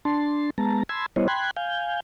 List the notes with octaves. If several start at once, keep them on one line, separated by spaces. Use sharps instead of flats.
D4 A5 C6
G#3 B3 A5 A#5
G#5 A5 B5 C6 E6 G#6
G3 B3 E4 C5 C#5 D#5
G5 B5 C6 F#6 G#6
F5 G#5 G6